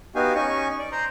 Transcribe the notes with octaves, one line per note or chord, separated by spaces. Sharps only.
B3 D#4 F#4 G4 F5 G#5
C#4 D#4 G#5 C#6
D5
C5 A#5 C6